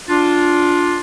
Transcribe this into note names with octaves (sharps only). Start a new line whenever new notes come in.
D4 F4